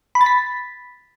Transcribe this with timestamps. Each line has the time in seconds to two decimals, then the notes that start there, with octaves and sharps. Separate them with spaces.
0.15 B5
0.21 A6
0.26 B6